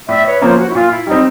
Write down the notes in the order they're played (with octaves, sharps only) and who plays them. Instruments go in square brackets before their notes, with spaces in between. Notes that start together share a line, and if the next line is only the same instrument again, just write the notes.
[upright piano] A2 [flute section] D5 E5
[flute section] B4 C#5
[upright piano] F3 A#3 C#4 [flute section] C5
[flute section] F#4
E4
[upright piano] A#2 [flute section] F4
[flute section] E4
[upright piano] G3 C4 [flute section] D#4